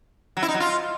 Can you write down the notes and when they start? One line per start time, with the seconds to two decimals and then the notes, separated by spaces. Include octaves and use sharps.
0.37 F#3
0.43 E4
0.48 D#4
0.54 F#3
0.60 F4